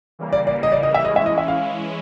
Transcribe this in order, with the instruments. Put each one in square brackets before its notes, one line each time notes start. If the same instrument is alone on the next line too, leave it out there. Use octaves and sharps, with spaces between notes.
[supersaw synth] C#3 E3 G3 A#3
[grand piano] D5
D5
D#5
D5
D#5
E5
[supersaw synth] E3 G#3 C#4 E4 [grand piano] D#5
[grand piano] E5
D#5
E5
F5